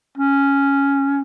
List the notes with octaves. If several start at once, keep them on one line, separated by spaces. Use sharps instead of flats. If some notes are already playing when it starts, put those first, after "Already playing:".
C#4